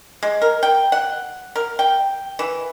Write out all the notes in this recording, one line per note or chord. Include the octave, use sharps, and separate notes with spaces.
G#3
A#4
G5
F#5
A#4
G5
E3